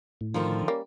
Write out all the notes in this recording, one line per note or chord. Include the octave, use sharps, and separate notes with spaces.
A2
D3 D#3 F3
G3 A#3 C#4